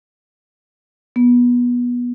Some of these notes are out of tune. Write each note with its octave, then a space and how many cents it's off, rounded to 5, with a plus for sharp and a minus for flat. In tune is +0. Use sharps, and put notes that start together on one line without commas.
B3 -20